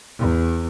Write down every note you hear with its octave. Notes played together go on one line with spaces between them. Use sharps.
E2